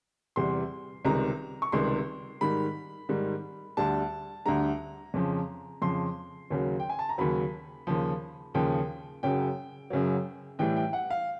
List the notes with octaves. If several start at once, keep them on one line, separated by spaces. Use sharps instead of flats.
E2 C3 E3 G3 C6
C#2 C3 D#3 G3 A#5
C#6
C#2 C3 D#3 G3 C6
G#2 D#3 G3 B5
G#2 D#3 G3
D2 D3 G3 A5
D2 D3 G3 A#5
F2 C#3 F3
F2 C#3 F3 C6
D#2 C#3 F#3
G5
G#5
A5
A#5
D#2 C#3 F#3 B5
D#2 C#3 F3
D#2 C#3 F3 G5
F#2 C#3 F#3 G5
F#2 C#3 F#3
A2 E3 G3 G5
G5
F#5
F5